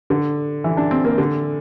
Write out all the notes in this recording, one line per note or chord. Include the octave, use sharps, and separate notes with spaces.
D3
E3
D4
C4
A#3
D3